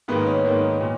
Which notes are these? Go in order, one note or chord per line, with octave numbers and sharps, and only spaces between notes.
G#2 D#3 A#3 B3
C#4
G#2 D#3 A#3
A#2